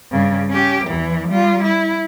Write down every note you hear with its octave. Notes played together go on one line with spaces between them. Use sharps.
G2 C#3
C#4 G4
E2 E3
G3 F4
E4